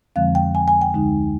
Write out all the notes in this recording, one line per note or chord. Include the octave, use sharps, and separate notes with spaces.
F2 D3 F3 G#3 C4 F5
G5
G#5
G#5
G5
D2 D3 G#3 D#4